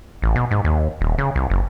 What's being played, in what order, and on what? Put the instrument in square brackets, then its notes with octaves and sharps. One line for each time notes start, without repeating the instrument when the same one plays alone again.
[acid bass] A1
B2
G#2
D#2
D#1
C#3
C2
F#1